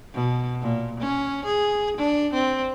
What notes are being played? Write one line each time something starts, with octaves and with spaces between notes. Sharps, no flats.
B2
A#2
C#4
G#4
D4
C4